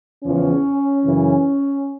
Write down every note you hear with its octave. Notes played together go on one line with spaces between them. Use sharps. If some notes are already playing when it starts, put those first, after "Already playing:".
E2 C#3 F3 C#4
F#2 C#3 E3